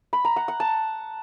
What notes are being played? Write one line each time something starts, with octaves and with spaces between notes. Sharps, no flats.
B5
A#5
F#5
F#5
A5